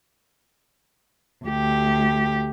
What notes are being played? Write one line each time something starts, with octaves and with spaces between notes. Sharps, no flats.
D2 G4